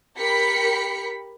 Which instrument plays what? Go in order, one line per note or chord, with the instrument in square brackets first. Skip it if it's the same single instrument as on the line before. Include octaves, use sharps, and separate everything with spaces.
[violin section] G4 A#4 B5 B6 C#7